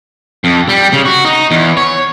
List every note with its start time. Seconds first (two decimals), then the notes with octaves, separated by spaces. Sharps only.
0.44 F2
0.69 G3
0.93 C#3
1.06 F#4
1.25 D#4
1.51 E2
1.77 C#5